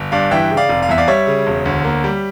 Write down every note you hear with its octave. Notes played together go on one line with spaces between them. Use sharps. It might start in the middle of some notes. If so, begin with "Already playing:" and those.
Already playing: G1
G2 D5 F5
E3 E5 G5
C#3
D5 F5
F1
F5
E2 E5
D5 F5
G3 C#5 E5
C#3
E1
D2
A#3
G3